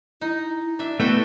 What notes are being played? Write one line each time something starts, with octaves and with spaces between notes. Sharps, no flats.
D#4 E4
D4 E5
A3 B3 F#4 A4 G5